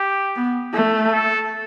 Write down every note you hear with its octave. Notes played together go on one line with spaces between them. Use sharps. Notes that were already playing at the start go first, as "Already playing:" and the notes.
Already playing: G4
B3
A3
A4